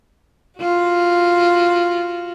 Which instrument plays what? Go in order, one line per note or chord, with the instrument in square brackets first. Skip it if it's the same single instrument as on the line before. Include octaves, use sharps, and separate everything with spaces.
[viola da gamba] F4 F#4